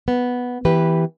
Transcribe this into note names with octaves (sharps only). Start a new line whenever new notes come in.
B3
E3 G4 B4